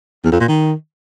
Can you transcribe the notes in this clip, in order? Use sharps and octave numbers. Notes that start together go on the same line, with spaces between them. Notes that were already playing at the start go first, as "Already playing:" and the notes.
E2
F2
A#2
D#3